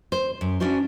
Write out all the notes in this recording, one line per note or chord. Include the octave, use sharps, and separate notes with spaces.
C5
F#2
C#4 D4 E4 F#4 C5